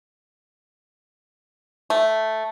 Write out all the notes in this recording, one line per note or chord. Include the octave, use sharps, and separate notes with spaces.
A3